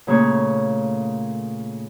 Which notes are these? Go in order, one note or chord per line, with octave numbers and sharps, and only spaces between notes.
A#2 C#3 A3 A#3 G#4 C#5